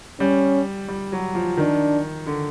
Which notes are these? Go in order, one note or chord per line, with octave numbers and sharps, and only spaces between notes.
G3 C#4
G3
F#3
F3
D#3 D4
D3